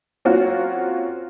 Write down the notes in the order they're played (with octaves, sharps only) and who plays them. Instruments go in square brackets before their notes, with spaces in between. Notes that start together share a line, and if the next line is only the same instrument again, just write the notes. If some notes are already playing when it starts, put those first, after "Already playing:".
[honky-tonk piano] F#3 A#3 C4 C#4 F4 F#4